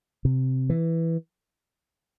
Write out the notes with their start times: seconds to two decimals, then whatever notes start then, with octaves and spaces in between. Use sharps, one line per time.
0.25 C3
0.70 E3